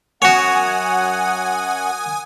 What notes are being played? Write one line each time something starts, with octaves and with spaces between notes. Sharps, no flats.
F#2 F#4 C#5 F#5 G#5 D#6